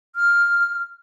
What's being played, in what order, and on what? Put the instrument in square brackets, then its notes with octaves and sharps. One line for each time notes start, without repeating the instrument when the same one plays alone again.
[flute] F6